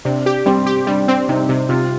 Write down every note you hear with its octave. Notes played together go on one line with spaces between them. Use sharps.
C3 D4
G4
G3 C4
G4
G3 D4
C4
C3 D#4
C3
C3 F4